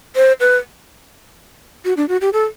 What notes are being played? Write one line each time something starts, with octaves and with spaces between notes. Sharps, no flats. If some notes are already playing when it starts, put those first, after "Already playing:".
C5
B4
F#4
D4
F#4
G4
A4